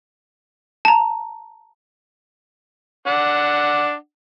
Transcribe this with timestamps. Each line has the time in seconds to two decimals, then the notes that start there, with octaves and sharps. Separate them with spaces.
0.85 A5 A#5
3.07 D4 F#5